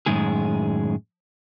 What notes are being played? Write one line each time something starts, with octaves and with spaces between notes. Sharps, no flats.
F#2 A2 D#3 G#3 G#4